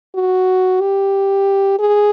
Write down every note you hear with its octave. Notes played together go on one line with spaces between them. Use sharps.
F#4
G4
G#4